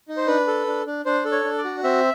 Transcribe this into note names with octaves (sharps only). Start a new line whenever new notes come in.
D#4
C5
D4 B4
A4
D4
D4
D4 C5
A4
C#5
D4
D5
F#4
C4 E5